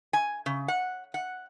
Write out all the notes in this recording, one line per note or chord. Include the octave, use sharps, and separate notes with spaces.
G#5
C#3
F#5
F#5